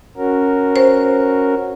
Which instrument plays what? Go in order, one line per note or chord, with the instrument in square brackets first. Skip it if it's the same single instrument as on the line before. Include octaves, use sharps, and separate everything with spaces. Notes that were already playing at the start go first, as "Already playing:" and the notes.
[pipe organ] C#4 F#4 A#4
[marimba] C5